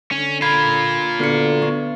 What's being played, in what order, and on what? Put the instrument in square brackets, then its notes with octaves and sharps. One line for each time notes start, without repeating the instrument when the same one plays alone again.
[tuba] D3 [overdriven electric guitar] C#4
[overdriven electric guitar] F4 A#4 [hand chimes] B5 G#6
[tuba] D3 [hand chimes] B3 F#4 C#7
[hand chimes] B3